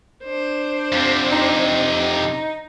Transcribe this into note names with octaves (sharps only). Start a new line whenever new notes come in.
D4 C5
F2 C3
D#4